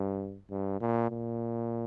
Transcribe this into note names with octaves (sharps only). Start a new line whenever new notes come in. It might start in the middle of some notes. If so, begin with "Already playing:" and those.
Already playing: G2
G2
A#2
A#2